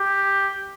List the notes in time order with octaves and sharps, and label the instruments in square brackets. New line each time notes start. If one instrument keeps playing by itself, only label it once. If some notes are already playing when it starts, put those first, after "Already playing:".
Already playing: [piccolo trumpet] G4